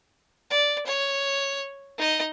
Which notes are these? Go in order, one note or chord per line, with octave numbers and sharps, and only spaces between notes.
D5
C#5
D#4 D#5